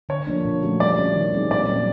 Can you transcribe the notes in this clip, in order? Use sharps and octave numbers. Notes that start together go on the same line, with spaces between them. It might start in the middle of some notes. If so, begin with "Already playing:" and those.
D3 C#5
F3 A#3 D4
A#2
F3 A3 C#4 F#4
G3 D5
A#3 C#4
D#3
G3 C4 D#4 G#4
A#2 D5
F#3 A#3 C#4